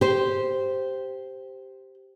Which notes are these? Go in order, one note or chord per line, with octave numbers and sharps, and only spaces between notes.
G4 C5